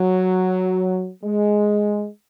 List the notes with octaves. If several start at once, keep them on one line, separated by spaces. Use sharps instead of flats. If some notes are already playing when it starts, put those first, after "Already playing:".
Already playing: F#3
G#3